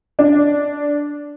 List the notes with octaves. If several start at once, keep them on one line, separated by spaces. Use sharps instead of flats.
D4